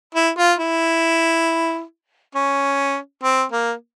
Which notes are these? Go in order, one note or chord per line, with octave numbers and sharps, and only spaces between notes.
E4
F4
E4
C#4
C4
A#3